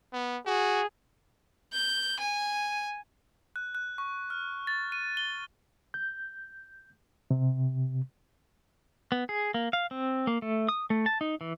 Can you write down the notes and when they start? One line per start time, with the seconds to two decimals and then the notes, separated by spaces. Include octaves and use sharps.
0.13 B3
0.46 F#4 G#4
1.73 G6
2.20 G#5
3.56 F#6
3.75 F#6
3.98 C#6
4.30 F6
4.67 A6
4.92 D#7
5.17 G7
5.94 G6
7.31 C3
9.12 B3
9.29 G#4
9.54 A#3
9.73 F5
9.91 C4
10.27 A#3
10.42 A3
10.69 D#6
10.90 A3
11.06 A5
11.21 D#4
11.41 E3